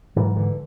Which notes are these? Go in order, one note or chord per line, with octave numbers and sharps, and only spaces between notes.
G#2 E3 F#3
D3 E3